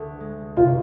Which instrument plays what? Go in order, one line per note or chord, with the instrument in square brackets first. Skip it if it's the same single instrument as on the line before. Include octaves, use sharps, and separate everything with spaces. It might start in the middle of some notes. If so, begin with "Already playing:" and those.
Already playing: [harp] D2
G#3
[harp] C3 [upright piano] F4